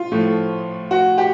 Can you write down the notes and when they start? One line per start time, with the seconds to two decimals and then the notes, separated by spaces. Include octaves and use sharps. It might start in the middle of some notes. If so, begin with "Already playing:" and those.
Already playing: F4
0.12 A2 F3 A3
0.91 F#4
1.18 G4